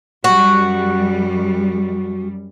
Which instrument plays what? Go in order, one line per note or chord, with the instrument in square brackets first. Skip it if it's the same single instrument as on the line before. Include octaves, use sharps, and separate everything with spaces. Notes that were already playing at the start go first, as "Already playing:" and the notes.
[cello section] F#2 G3 [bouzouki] F#4